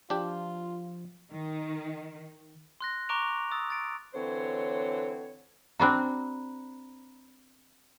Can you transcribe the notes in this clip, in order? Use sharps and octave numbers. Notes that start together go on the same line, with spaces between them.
F3 D4 F4 G4
D#3
C6 F#6 A#6
A#5 C#6 D6 F#6 D7 F7
D#6 E6 A6
A6 D7
D3 E3 C4 C5 C#5
C4 D4 F#4 A#5 B5 F#6